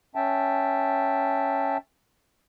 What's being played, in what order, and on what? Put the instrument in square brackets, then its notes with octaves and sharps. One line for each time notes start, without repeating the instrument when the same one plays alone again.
[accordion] C#4 E5 G5 A5